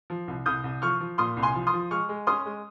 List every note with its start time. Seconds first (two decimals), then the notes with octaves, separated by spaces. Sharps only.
0.10 F3
0.28 C2
0.46 C2 D#6 G6
0.64 C2
0.82 F3 C#6 F6
1.00 F3
1.18 A#2 C6 D#6
1.37 C2
1.43 G#5 C6
1.55 F3
1.67 C6 D#6
1.73 F3
1.91 G#3 C#6 F6
2.09 G#3
2.27 C#4 C6 D#6
2.45 G#3